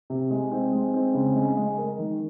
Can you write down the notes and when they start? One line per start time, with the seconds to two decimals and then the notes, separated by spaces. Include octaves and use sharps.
0.10 C3
0.30 G#3
0.51 C4
0.73 G#3
0.94 C4
1.14 C#3
1.36 G#3
1.57 G#3
1.78 A#4
1.98 D#3